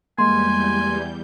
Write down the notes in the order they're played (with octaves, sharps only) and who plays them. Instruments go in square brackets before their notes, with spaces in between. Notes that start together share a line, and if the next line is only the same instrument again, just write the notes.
[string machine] E2 G3 G6 [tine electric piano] G#3 A#3 [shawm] G#5 [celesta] C6